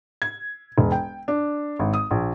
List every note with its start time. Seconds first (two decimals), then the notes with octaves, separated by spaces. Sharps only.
0.22 G#6
0.78 E1
0.92 G5
1.28 D4
1.79 G#1
1.94 D#6
2.11 A#1